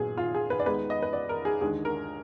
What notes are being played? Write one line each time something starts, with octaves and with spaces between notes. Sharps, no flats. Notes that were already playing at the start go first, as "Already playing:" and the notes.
Already playing: A#2 F#3 B3 G#4
F4
G#4
B4
D5
D#2 D#3 G#3 B3 B4
D#5
B4
D5
A#4
G#4
D#2 D3 G#3 G#4
A#4